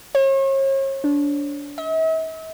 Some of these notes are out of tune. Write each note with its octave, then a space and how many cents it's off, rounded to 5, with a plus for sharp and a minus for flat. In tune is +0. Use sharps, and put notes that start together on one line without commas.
C#5 -40
D4 -25
E5 -45